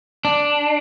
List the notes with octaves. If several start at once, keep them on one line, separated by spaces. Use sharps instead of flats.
D4